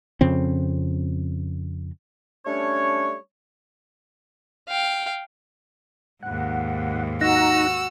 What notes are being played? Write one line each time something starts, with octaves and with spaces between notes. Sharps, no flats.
F2 C#3 C4
G3 A3 C#4 D4 C#5
F5 G5
D#2 G#2 F#5
D#4 F#4 F#5 A#5 E6